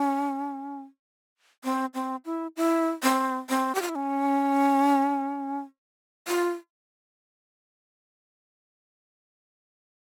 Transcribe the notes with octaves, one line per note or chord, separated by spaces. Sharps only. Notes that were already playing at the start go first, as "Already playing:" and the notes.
Already playing: C#4
C4
C4
E4
E4
C4
C4
G4
F4
E4
C#4
F4